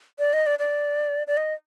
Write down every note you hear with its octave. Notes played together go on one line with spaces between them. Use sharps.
D5
D#5
D5
D5
D5
D#5